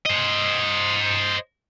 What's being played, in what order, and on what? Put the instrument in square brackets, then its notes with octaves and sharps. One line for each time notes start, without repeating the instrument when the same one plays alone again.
[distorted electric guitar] C5 D#5